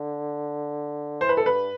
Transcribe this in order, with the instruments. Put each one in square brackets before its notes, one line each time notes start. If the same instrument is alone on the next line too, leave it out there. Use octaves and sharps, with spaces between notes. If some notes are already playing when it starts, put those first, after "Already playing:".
Already playing: [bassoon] D3
[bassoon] E3 [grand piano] C5
[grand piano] B4
A4
[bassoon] G2 [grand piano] B4